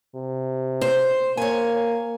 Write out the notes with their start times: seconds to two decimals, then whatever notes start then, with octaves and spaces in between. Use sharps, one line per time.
0.15 C3
0.81 C5
1.37 A#3 C#5 G#5